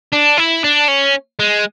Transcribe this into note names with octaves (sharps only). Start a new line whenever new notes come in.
D4
E4
D4
C#4
G#3